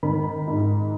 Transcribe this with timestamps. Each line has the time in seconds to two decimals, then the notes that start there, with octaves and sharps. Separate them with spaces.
0.03 D#3 B5
0.47 G#2